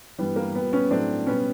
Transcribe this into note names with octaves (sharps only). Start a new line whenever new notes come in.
G2 E3 G3 B3
A#3
A#2 G3 B3
B3 C#4
A2 F#3 A3 C4 D4
B2 G3 B3 C#4